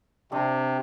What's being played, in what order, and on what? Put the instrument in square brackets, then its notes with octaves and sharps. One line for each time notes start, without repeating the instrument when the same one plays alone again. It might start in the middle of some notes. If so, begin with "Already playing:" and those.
[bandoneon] C3 [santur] C4 D4